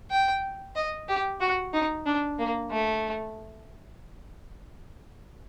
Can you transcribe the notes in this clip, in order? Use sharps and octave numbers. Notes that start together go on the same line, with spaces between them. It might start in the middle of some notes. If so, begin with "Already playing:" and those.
G5
D#5
G4
F#4
D#4
D4
A#3
A3